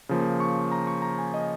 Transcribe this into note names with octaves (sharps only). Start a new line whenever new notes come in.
C#3 F3 A#3
C#6
A#5
C#6
A#5
G#5
D#5